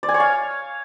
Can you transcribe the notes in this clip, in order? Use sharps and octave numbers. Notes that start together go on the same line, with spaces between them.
D5
G#5
C#5
F5